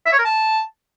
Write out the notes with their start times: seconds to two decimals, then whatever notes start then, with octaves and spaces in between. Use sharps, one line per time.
0.06 E5
0.12 C#5
0.19 A#4
0.25 A5